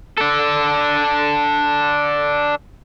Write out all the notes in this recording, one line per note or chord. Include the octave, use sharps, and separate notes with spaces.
D4 A4